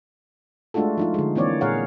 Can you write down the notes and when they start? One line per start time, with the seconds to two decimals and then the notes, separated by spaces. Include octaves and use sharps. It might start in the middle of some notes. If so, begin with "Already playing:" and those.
0.74 G#3 A3 D4 F4 F#4 A4
0.97 F3 D#4 F4
1.14 D3 G#3
1.36 E3 A#3 C4 C#5 D5
1.61 A#2 G#4 A#4 C#5 F5 F#5